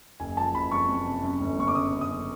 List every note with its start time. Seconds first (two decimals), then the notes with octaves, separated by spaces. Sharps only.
0.20 F#1 G#5
0.37 F3 A5
0.54 F#1 B5
0.71 F2 C#6
0.89 F2
1.06 C3
1.23 F#2
1.40 G1
1.58 G1 C#6
1.68 D6
1.75 C#3 D#6
1.92 F#2
2.01 D#6
2.10 F#2